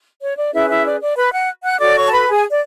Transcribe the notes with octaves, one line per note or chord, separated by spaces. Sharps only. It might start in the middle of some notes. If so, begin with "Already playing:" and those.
C#5
D5
C#4 E4 G#4 B4 E5
E4 E5
D5
D5
B4 B5
F#5 F#6
F#5 F#6
F#4 A4 C#5 D5 D6
C#5 C#6
A5
B4 B5
G#4 G#5
D5